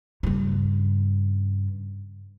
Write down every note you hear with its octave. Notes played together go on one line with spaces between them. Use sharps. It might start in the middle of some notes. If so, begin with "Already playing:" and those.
G2 C#3